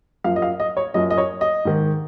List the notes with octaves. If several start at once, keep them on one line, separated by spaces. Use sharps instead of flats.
F#2 F3 F5
D#5
F5
D#5
C#5
F#2 F3 D#5
D#5
C#5
D#5
G#2 D#3